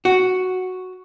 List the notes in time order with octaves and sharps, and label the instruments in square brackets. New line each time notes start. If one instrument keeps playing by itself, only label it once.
[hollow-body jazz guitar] F#4